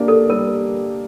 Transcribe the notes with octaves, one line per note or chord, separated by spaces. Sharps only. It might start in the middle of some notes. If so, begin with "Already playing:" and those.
Already playing: A#3 D4 G4
A4
G3 A#4